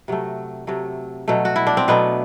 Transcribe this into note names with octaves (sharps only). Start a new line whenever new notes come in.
C3 F#3 A3
C3 F#3 A3
B2 F#3 A3
F#4
E4
D4
C4
B2 F#3 A3 B3